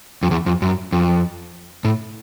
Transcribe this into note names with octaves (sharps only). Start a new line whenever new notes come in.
F2
E2
F2
F#2
F2
A2